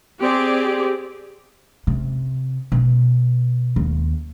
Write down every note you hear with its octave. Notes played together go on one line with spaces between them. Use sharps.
C4 G4 G#4 D5
C3
B2
D#2